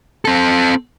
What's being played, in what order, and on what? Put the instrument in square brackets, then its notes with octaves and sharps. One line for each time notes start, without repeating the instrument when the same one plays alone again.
[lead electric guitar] C4 A4